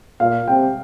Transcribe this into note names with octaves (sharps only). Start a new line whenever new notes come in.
A#2 F5
C3 G5